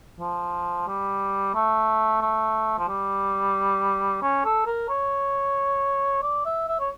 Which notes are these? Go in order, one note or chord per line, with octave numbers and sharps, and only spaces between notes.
F3
G3
A3
A3
F3
G3
C#4
A4
A#4
C#5
D5
E5
E5
C#5